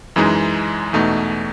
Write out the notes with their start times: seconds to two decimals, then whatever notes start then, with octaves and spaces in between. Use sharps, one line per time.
0.16 F#2 E3 G#3 D#4
0.93 E2 B2 A3 D#4